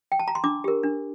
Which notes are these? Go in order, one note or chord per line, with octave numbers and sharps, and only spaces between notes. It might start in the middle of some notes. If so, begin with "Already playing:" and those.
G5
A5
A#5
C6
D4 D6
G4 A#4
D4